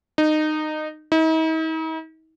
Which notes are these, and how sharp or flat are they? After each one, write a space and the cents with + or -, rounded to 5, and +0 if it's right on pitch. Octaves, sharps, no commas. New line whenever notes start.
D#4 -20
D#4 +45